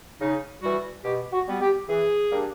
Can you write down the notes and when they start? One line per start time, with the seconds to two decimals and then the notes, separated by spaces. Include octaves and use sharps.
0.20 C#3 D#4
0.62 E3 G3 F#4
1.04 B2 G4
1.32 F#4
1.47 G3 B3
1.61 G4
1.88 E3 G#4
2.31 G3 A#3 D4